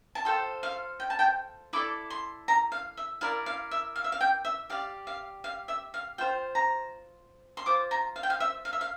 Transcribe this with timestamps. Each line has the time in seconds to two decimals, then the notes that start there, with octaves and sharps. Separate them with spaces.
0.15 A5
0.25 F4 A4 C5 G5
0.63 F5
1.00 G5
1.10 A5
1.19 G5
1.73 E4 A4 D5 D6
2.10 C6
2.48 A#5
2.72 F5
2.97 E5
3.21 E4 A#4 D5 F5
3.46 F5
3.71 E5
3.96 F5
4.04 E5
4.12 F5
4.21 G5
4.45 E5
4.70 G4 D5 F5
5.07 F5
5.44 F5
5.68 E5
5.94 F5
6.18 F4 C5 G5
6.55 A#5
7.57 C6
7.66 F4 C5 D6
7.91 A#5
8.16 F5
8.23 G5
8.30 F5
8.40 E5
8.65 F5
8.73 E5
8.81 F5